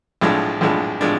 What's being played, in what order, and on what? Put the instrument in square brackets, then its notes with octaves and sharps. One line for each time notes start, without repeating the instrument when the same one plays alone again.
[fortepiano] B1 A2 F3 G#3 D4
B1 A2 F3 G#3 D4
A2 F3 G#3 D4